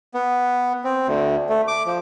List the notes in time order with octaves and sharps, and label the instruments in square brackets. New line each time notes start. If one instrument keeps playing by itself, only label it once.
[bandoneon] B3
C4
D2
A3
D6
F3